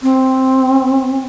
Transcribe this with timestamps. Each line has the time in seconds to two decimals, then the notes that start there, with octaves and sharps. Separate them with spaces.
0.02 C4